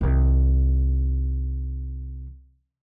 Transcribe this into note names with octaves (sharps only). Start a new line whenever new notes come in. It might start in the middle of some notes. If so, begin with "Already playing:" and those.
C2 D#3